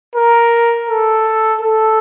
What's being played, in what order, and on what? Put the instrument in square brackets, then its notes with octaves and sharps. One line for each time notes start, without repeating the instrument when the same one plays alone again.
[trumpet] A#4
A4
A4